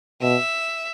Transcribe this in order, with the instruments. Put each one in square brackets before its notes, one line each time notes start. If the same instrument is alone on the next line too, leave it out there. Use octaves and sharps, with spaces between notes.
[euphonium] B2 [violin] E5